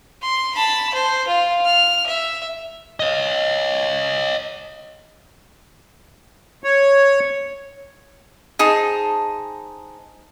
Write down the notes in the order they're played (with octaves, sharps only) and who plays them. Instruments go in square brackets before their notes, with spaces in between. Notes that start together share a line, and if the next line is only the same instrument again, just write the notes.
[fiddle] C6
A5 B5
C5
F4
F6
E5
[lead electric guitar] C#5 D#5
[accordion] C#5
[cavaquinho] D#4 G#4 C5 A5